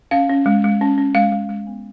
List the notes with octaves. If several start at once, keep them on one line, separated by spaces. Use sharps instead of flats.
C#4 F5
C#4
G#3
G#3
C#4
C#4
G#3 F5
G#3
G#3
B3